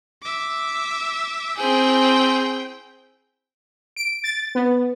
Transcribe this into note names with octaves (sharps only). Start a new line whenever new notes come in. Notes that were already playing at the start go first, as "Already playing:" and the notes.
E5 D6
C4 E4 G#4 G5
D7
A6
B3